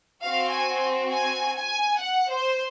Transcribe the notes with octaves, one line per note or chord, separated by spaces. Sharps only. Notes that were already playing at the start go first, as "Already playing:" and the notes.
C4 F#4 F5
G#5
G#5
G#5
F#5
C5